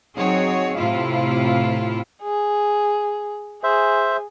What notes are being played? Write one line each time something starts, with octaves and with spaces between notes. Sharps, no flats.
F#3 C4 D#4 F#4 G#4 C#5
A2 C3 E4 F4 F5
G#4
G#4 C5 E5